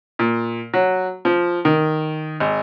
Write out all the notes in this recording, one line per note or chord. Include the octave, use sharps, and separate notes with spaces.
A#2
F#3
F3
D#3
G#1